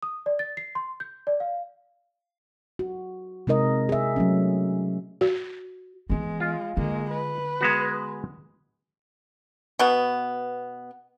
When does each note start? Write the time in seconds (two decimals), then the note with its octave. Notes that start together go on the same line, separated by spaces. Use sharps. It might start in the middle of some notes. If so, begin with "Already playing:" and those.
0.03 D#6
0.26 D5
0.39 A6
0.57 C7
0.75 C6
1.00 G6
1.27 D5
1.40 F5
2.79 F#4
3.47 C3 G#3 D#4 A#4 D#5
3.89 G#4 E5
4.16 F#3 A3 C#4
5.21 F#4
6.10 E3 G#3 B3
6.40 F4
6.77 D3 G#3 A#3
7.11 B4
7.61 G#3 B3 F#4
9.79 B2 B3